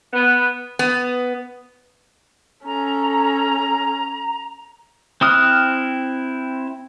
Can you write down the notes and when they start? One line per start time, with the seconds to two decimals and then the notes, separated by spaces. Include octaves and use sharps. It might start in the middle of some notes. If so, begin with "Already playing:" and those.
0.14 B3
0.79 B3
2.66 C#4 A4 A#5
5.21 C4 E4 D#6 F6 F#6